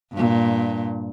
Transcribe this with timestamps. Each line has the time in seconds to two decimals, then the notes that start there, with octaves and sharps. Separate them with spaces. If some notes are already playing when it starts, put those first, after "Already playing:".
0.13 G2 A#2